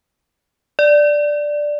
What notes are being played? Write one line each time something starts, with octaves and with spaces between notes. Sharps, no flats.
D5